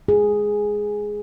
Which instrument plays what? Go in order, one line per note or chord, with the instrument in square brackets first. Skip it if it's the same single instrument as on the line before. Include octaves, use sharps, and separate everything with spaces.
[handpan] G#4